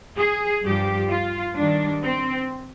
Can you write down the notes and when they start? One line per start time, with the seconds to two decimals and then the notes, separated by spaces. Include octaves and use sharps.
0.18 G#4
0.64 G2 F3 G4
1.10 F4
1.56 G2 D#3 G3 D4
2.03 C4